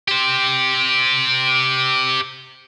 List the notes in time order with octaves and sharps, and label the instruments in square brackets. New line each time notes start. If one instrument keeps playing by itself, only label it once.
[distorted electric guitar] G4 C5